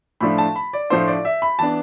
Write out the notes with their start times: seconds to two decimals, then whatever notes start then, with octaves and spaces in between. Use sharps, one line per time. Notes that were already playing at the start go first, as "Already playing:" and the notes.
0.21 A2 F3 A3 D4 B5
0.38 A5
0.56 B5
0.73 D5
0.90 A2 F3 A3 D4 C5
1.07 D5
1.25 E5
1.42 B5
1.59 E3 B3 D4 A5